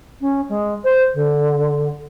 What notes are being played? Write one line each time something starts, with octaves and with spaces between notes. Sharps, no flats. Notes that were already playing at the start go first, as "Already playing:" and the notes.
C#4
G#3
C5
D3